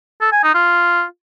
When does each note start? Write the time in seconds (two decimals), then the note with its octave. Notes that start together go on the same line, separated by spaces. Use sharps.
0.21 A4
0.32 G#5
0.43 D#4
0.54 F4